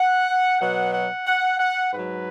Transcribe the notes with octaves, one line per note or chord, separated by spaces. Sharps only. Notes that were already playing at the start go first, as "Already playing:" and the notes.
Already playing: F#5
B2 F#3 F#5
F#5
F#5
F#5
G#2 F#3 B4